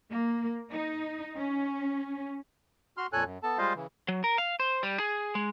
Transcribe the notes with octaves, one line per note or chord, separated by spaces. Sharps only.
A#3
D#4
C#4
F#4 C6 F6
F2 A#2 A4 C#5 G#5 F#6
F#2
B3 A4 A5
G3 G#3 F4 C5 D#5 F5
C#3 E3
F#3
A#4
F5
C5
G3
G#4
G#3